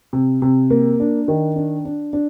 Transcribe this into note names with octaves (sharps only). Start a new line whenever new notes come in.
C3
C3
A#3
D4
D#3
D4
D4
D4